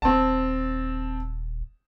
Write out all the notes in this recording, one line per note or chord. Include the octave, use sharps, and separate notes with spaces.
D#1 C4 A5